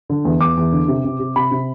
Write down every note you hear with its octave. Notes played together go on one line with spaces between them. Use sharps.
D3
E2
E2 D6
E2
D3
C3
C3
C3
C3 B5
C3